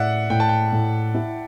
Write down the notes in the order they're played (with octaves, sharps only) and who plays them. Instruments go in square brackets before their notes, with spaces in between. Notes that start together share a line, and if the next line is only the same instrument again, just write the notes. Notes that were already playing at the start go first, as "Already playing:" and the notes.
Already playing: [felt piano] A2 [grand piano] D5 E5 F#5
[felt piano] A2 [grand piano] G5
[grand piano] A5
G5
[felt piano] A2
E4